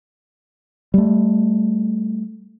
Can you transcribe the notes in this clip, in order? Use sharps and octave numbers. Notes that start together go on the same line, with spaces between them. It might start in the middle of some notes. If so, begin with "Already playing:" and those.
G3 A3